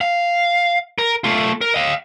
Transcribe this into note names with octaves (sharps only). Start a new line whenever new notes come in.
F5
A#4
A3 F4
A#4
D#5 F5